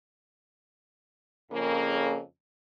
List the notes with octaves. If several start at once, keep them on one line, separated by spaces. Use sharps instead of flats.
F2 C#3 A#3